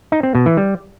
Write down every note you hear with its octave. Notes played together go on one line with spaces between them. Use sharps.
D#4
C4
B2
E3
G3